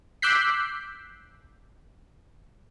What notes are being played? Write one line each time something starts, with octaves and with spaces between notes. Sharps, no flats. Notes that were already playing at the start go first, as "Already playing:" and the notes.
D6 E6 F#6 G6 B6 C7